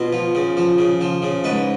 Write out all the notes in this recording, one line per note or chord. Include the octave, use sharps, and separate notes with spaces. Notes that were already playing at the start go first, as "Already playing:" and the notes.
Already playing: B2 F4
F3
C#3
F3
C#3
F3
C#3
G#2 B4